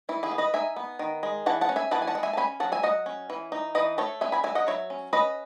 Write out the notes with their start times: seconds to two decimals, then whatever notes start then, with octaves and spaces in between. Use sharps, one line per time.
0.09 E3 E4
0.23 E4 G#4
0.31 B3
0.38 B4 D#5
0.54 D#4 E5 G#5
0.76 B3
0.99 D#3
1.23 G#3
1.46 E3 F#5 A5
1.61 F#5 A5
1.69 C#4
1.76 E5 G#5
1.91 E3 F#5 A5
2.02 G#5
2.07 F#5 A5
2.15 G#3
2.23 E5 G#5
2.33 A5
2.37 C#4 G#5 B5
2.60 F#3 F#5 A5
2.72 E5 G#5
2.83 F#3 D#5 F#5
3.06 C#4
3.30 E3
3.52 D#4
3.75 E3 B4 D#5
3.98 A3 A4 C#5
4.21 C#4 E5 G#5
4.32 G#5 B5
4.44 F#3 E5 G#5
4.55 D#5 F#5
4.67 F#3 C#5 E5
4.90 C#4
5.13 C#4 B4 D#5